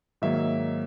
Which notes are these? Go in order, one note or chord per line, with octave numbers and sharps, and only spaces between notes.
G#2 D#3 F#3 A#3 E5